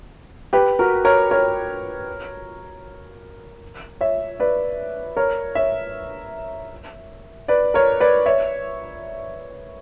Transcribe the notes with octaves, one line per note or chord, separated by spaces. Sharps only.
G4 B4
F#4 A#4
A#4 C#5
A#4 C#5
C#5 E5
B4 D5
A#4 C#5
C#5 E5
B4 D5
A#4 C#5
B4 D5
C#5 E5